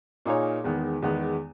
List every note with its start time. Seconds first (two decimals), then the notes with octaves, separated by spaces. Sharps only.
0.25 A#2 A#3 D#4 G#4 C#5
0.64 E2 D#3 G#3 B3
1.02 E2 D#3 G#3 B3